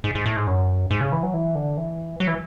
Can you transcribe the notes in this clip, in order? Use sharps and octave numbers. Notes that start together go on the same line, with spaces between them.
G#2
G#2
A2
G#2
F#2
G#2
C#3
E3
F#3
E3
D3
E3
F#3
E3